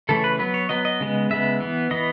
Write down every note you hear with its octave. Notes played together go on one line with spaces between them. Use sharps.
C#3 E3 A3 C#4 A4
B4
F#3 B3 B4
C#5
F#3 B3 D#5
D#5
C#3 G#3 B3
C#3 G#3 B3 E5
E3 B3
E3 B3 D#5